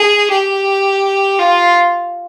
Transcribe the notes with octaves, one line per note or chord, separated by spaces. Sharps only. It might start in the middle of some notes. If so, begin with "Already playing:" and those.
Already playing: G#4
G4
F4